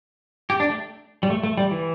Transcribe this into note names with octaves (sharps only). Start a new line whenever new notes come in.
G4
D4
A3
G3
A3
A3
G3
E3